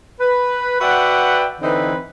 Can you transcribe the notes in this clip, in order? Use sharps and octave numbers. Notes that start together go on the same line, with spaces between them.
B4
F#4 B4 D5 E5 F#5 G5
D3 E3 C4 D#4 E4 B4